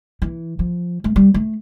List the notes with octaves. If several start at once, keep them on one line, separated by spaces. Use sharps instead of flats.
E3
F3
A3
G3
A3